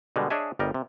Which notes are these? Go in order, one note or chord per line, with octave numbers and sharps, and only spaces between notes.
B2 D3 G3 G#3
D4 G#4 C#5 D#5 E5 G#5
G1 G3 A#4 D#5
C3